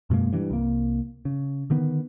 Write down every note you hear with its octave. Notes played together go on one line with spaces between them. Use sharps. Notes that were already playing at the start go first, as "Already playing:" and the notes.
F#2 B2 G#3 A#3
G2 E3
C2 A#3
C#3
D3 D#3 B3